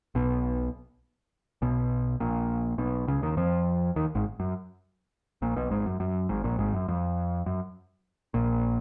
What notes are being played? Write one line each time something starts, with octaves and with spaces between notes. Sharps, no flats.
B1 B2
B1 B2
A#1 A#2
B1 B2
C#2 C#3
D#2 D#3
F2 F3
D#2 D#3
G#1 G#2
F#2
A#1 A#2
B1 B2
G#1 G#2
F#2
F#2
G#1 G#2
A#1 A#2
G#1 G#2
F#2
F2
F#2
A#1 A#2